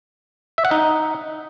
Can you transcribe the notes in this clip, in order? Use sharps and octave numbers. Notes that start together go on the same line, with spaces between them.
E5
F#5
D#4